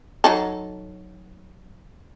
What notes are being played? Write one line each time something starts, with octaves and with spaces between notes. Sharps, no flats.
F#3 D#4 A4